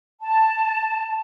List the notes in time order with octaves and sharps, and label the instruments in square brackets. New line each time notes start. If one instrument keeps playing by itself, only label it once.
[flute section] A5